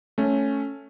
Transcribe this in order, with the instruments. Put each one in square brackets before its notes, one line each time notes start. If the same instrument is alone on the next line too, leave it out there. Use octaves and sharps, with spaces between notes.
[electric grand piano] A3 C#4